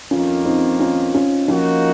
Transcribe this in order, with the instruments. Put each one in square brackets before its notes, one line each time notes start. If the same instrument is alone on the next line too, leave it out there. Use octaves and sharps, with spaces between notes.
[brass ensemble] F2 D#3 A#3 [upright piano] C#4 F4
[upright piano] C4 D#4
C#4 F4
C#4 F4
[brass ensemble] F3 A#3 D#4 F#4 [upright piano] C#4 F4